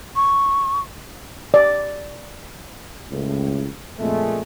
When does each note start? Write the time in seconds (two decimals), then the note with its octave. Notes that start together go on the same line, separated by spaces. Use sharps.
0.16 C#6
1.54 D5
3.10 C#2 A2
3.99 F2 A#2 G#3 A3